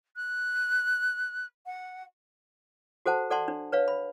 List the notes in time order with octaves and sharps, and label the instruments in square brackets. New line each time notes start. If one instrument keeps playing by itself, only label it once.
[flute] F#6
F#5
[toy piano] F#4 A4 C5 F#5 A5
A4 D5 F#5 A5 C6
D4
B4 C#5 F5
B5